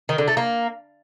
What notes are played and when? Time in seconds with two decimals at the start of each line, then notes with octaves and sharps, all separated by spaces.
0.09 D#3
0.18 D3
0.28 A3
0.37 A#3